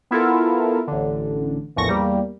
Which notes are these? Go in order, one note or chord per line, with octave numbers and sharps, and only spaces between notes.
B3 E4 F4 A4 A#4
A1 D3
A#1 E2 A2 F3 C#6 A#6
E2 G3 A#3